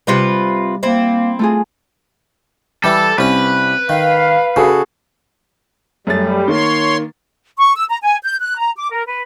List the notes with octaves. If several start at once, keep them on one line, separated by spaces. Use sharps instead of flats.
C3 G3 F4 B4
A#3 C4 E4
A3 F4 G#4
E3 G3 A4
C2 C#4 B4
D#3 F5
C#3 F#4 G#4 A4
F#2 G3 A3 A6
D#3 A#3 C#5 C6
C#6
E6
A#5
G#5
G6
F#6
A#5
D6
A#4
B4